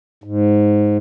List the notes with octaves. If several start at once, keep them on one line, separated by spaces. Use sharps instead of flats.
G#2